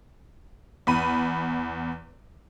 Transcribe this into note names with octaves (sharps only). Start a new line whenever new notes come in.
E2 B5 D#7